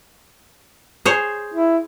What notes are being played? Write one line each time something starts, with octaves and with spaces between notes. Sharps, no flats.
G#4 C5 C#5
E4